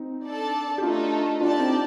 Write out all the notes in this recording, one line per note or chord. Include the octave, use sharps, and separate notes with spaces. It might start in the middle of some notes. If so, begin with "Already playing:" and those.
Already playing: C4 D#4
D4 A4 D5 A5
G4
A3 D4 D#4 F4 A4
D4 F4 G4 D5 A5
C4 D#4